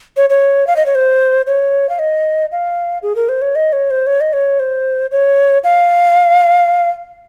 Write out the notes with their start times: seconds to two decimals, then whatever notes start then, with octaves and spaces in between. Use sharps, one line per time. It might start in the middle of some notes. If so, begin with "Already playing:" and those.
0.17 C#5
0.30 C#5
0.67 F5
0.76 D#5
0.86 C#5
0.95 C5
1.47 C#5
1.89 F5
1.99 D#5
2.52 F5
3.03 G#4
3.16 A#4
3.29 C5
3.42 C#5
3.55 D#5
3.73 C#5
3.91 C5
4.07 C#5
4.21 D#5
4.33 C#5
4.60 C5
5.12 C#5
5.64 F5